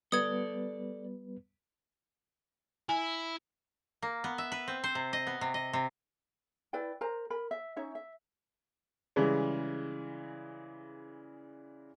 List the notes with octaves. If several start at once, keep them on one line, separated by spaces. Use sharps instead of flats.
G3 B3 A4 B4 D5 D#6 G#6
E4 G#5
A#3
B3
E5
B4
C4
C5
C3
D#5
B3
C3
D#5
C3
E4 B4 D5 G5
A#4 C5 A#5
A#4 B5
E5
C#4 D#4 C#5 E5
E5
C#3 E3 G3 G#3